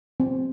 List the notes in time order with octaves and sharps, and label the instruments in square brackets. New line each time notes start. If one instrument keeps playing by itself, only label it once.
[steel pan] C4